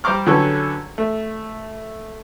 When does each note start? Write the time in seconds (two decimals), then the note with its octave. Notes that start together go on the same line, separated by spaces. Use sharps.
0.04 G3 C5 A#5 C6 D6 F6
0.27 D3 F#3 C#4 G4 A4 B4
0.98 A3